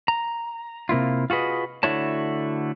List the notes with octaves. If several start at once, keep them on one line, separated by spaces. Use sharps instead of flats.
A#5
C3 A#3 E4 F4
F4 F#4 G#4 B4 D#5
D3 A3 E4 F#4 C#5 A5